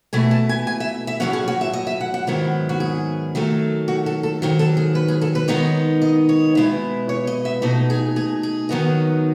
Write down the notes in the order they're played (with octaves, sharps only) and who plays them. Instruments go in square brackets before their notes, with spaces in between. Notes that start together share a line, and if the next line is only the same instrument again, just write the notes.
[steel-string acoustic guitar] B2 A3 E4 G#5
A5
G#5
G#5
E5
E5
A2 F#3 A3 C#4 F#5
G#4
F#4
E5
D#5
E5
F#5
F#5
G#2 D#3 F#3 B3 E4
F#4
G#4
D#3 F#3 A3
F#4
A4
A4
G#2 D#3 F#3
A4
G#4
B4
G#4
A4
B4
D#3 G#3 B3 D#4 C#5
D#5
C#5
B2 G#3 B3 E4
C#5
D#5
E5
B2 A3 D#4 D#5
G#4
G#4
G#4
D#3 F#3 B3 D#4